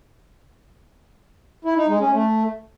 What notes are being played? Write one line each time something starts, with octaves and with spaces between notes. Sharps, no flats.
E4
D#4
G#3
C#4
A3